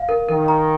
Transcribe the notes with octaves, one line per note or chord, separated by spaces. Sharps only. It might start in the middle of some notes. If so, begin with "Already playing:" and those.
Already playing: F5
A#4
D#3 A#4
A#5